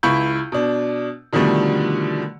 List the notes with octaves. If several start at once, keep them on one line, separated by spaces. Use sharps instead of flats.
C#2 E4 B5 C#6 G6
B2 D4
B2 D3 D#3 F3 G3 A3